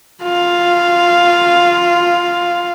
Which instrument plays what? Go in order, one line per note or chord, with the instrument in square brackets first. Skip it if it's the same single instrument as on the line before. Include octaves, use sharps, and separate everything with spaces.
[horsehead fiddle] F4 F5